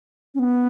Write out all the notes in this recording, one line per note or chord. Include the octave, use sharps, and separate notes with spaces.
C#4
B3